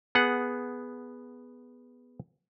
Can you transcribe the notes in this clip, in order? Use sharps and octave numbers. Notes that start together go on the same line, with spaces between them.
B3 G#4 F#5